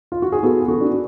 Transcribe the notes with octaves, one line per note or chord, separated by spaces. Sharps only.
F4
F#4
G#4
B3 F#4 A4
F#4 A4
D4